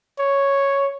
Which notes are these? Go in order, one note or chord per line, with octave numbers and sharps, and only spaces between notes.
C#5